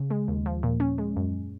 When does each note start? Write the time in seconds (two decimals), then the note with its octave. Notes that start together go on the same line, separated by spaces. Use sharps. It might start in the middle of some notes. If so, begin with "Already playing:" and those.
Already playing: C#3
0.10 G#3
0.28 D#2
0.46 F3
0.63 A#2
0.80 C#4
0.98 G#3
1.17 F#2